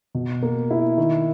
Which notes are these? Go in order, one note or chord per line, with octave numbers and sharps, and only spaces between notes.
B2
A#3
E4
D#3